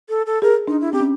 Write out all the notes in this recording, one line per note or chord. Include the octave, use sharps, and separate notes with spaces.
A4
A4
G#4 A#4
D4 D#4
E4
C4 G4
C#4